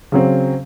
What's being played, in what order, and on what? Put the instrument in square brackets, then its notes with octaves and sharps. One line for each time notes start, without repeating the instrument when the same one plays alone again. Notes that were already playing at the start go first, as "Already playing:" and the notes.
[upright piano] C#3 F#3 C4